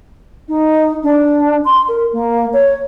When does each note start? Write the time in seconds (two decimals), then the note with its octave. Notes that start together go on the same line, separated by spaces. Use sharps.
0.48 D#4
1.03 D4
1.65 C6
1.88 A#4
2.13 A#3
2.53 C#5